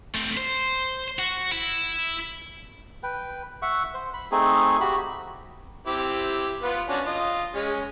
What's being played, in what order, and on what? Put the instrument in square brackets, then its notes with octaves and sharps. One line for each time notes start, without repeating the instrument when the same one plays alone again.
[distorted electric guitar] A3 C4
C5
F#4
E4
[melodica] B4 G5
E5 F#5 C#6
C5
B5
A3 C4 D#4 G#4
F#4 G4 B5
[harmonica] C4 E4 G4
B3 F4 B4
C#4 D4 F#4
F4 D#5
G#3 C#4